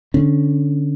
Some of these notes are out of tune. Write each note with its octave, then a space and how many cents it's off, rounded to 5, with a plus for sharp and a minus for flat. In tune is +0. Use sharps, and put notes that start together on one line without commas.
D3 +0 C#4 -15